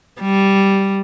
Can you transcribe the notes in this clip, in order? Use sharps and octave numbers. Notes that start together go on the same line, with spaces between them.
G3